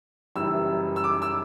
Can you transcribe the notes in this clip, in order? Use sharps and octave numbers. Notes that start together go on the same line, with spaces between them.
F#1 F#2 E3 G3 E6
E6
D6
E6